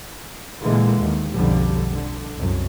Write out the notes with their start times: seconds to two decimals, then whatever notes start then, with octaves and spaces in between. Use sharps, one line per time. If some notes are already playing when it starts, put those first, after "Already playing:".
0.61 A#2 D3 E3 G#3 A#3
1.00 D#2
1.32 B1 F2 D3 G3
1.92 D3
2.36 C2 F#2